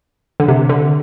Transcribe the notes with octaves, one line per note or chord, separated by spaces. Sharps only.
D3
C3
D3